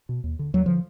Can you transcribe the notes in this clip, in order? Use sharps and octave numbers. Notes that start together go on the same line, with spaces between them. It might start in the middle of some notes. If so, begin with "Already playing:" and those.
B2
D#2
D3
D#2 F#3
D3 F3